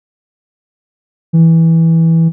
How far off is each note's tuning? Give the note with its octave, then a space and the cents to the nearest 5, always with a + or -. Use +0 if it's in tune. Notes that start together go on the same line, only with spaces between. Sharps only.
E3 -10